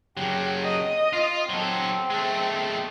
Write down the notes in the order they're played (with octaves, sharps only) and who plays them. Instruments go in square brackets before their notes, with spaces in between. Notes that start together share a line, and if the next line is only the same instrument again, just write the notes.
[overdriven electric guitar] C#3 F#3 [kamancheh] G4
[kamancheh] D#5
[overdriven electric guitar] F4
[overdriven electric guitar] F#3 A4 [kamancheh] C4
[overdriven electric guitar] G#3 A3